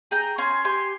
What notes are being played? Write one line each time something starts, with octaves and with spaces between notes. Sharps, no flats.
G#4 G5 A#5
C#4 G#5 C6
G4 G#5 C6